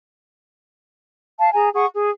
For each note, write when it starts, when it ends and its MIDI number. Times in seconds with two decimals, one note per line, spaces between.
1.39 1.49 77
1.39 1.49 81
1.53 1.68 68
1.53 1.68 80
1.53 1.68 82
1.73 1.86 68
1.73 1.86 78
1.73 1.86 85
1.93 2.10 68